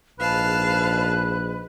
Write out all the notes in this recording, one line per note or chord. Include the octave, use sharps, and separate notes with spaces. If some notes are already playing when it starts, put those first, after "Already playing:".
A#1 G#2 B4 F5 A5 F#6